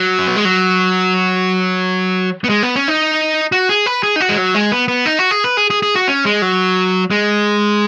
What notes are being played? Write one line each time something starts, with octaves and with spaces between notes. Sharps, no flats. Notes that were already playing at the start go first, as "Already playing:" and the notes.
Already playing: F#3
C#4
B3
G#3
F#3
B3
G#3
B3
C#4
D#4
F#4
G#4
B4
G#4
D#4
F#4
G#3
F#3
G#3
B3
B3
D#4
F#4
G#4
B4
G#4
G#4
G#4
F#4
C#4
G#3
F#3
G#3